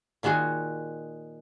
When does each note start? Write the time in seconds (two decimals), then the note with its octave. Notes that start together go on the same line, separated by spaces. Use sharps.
0.23 A#2 D#3 G#3 F#4 G#4